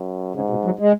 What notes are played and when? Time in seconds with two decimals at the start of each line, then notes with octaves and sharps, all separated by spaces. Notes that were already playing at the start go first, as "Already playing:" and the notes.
Already playing: F#2
0.35 G#2 C#3
0.50 B2
0.65 F#3
0.79 G#3